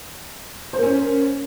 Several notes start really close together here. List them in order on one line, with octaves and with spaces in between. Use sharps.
C5 A#3 C#4